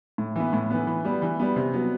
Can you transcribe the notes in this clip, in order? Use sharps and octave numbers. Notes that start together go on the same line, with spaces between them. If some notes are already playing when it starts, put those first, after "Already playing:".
A2
E3 B3
A2
E3 B3
E3
G3 B3
E3
G3 B3
C3
F#3 B3